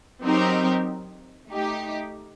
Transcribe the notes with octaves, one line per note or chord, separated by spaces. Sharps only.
F#3 C4 D#4 G4 A#4
A3 D#4 G4